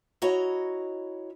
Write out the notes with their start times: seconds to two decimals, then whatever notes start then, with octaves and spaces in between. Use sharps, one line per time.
0.22 E4 F#4 C#5 D#5 A#5